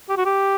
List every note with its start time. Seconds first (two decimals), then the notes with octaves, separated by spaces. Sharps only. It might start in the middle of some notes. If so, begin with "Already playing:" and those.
0.09 G4
0.17 F#4
0.25 G4